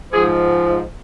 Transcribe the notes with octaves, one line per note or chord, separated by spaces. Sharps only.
G#2 F3 G#4